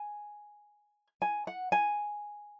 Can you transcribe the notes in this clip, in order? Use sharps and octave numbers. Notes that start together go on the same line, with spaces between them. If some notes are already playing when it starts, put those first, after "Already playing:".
Already playing: G#5
G#5
F#5
G#5